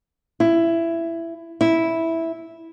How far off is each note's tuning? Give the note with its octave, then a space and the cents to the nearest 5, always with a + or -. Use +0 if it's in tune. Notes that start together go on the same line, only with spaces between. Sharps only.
E4 +15
E4 -5